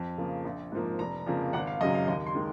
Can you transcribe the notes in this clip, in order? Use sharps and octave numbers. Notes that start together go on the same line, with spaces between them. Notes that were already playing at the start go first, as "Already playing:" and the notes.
Already playing: F2
C#3 F3 A#3
A#1
G#2 F3 A#3
F1 A#5
F2 C#3 F3 A#3
G#1 F#5
F5
F#2 C#3 F#3 D#5
F5
D#2 D#5
C6
D#3 G#3